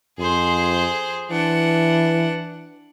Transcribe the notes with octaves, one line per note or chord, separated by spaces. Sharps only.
F2 G#4 C5
E3 D4 F#5